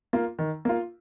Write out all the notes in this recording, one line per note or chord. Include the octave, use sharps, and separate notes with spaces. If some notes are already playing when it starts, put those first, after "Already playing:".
A#3 F4
D#3
A#3 F4